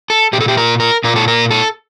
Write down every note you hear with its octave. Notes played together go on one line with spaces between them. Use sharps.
A4
A#2 G4
A4
G4
A#4
A#4
A#2 A#4
A4
A#4
A4